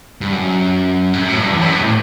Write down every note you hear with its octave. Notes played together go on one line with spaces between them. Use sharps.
G2
F#2
G2
F#2
A2
G2
E2
F#2
G2
B2
A2